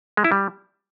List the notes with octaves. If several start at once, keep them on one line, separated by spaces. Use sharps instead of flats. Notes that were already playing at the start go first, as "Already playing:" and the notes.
G#3
E4
G3